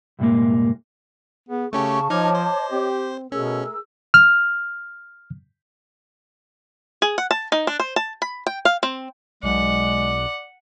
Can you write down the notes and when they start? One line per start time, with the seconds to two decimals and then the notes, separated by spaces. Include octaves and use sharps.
0.19 C2 G2 A#2 G#3 A#3
1.48 B3 G#4
1.73 C#3 A3 C#4 G4 A5 C#6
2.10 F3 D#4 C#5 D#5 D6 F6 G#6
2.35 C5
2.71 C4 G4
3.32 B2 A3 C#4 G#4 A#4 E6
4.14 F6
7.02 G#4
7.18 F#5
7.31 A5
7.52 D#4
7.67 D4
7.80 C5
7.96 A5
8.22 B5
8.47 G5
8.65 F5
8.83 C4
9.43 B1 G#3 D5 F#5